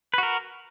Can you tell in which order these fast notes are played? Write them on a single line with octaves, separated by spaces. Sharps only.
B4 F#4 A#4